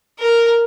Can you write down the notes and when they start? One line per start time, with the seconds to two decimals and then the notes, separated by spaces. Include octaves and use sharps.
0.19 A#4